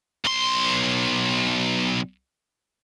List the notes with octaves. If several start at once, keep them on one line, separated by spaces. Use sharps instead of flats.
B1 C6